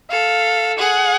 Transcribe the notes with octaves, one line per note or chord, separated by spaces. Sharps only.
A4 F5
G#4 F#5